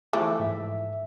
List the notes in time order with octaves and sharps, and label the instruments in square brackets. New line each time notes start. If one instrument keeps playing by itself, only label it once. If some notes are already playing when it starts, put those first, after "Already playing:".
[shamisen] E3 F3 A3 [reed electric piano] D6
[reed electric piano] G#2 E5